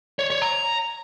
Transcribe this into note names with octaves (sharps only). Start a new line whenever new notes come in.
C#5
C#5
A#5